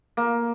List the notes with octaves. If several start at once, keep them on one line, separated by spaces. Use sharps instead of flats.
A#3